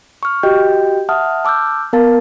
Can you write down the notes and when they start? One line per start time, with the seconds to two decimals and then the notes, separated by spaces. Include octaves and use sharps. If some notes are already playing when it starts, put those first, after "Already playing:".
0.23 C#6 F6
0.43 F#4 G4 D#5 G5 G6
1.09 E5 F#5 A5 D#6 F6
1.45 A5 D6 E6 F6 G6
1.93 B3 A#4 F5 A5 A6